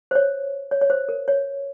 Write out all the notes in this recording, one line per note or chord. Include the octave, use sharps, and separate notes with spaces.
C5
C#5
C#5
C#5
C5
A#4
C#5